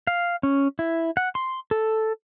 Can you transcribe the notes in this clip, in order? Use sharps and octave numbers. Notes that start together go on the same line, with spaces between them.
F5
C#4
E4
F#5
C6
A4